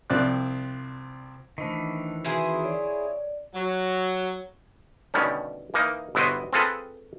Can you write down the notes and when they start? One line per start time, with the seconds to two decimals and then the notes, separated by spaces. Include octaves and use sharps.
0.10 C2 F3 C4 D5 F#6
1.58 D#3 E3 A3 D4 C5 D#5
2.25 C4 E4 F#4 G#4 B4 A#5
2.64 C#5 D5
3.55 F#3
5.14 B2 D3 D#3 G3 A3 C#4
5.74 E3 A#3 D#4
6.15 G1 B3 E4 F#4 C5 D#5
6.53 C4 F4 G#4 A4 B4